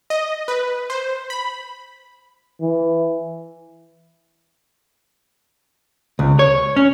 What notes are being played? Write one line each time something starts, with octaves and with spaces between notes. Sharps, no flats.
D#5
B4
C5
B5
E3
C#2
C#5
C#4